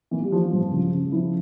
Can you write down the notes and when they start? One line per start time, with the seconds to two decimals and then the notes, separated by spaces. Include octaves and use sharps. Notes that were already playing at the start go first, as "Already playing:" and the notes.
0.11 E3 A#3
0.22 G3
0.32 E3 F3
0.52 G2 F3
0.72 C#3
0.93 C#3
1.12 F3 E4